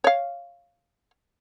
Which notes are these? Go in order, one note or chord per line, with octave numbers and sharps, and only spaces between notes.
C#5 F5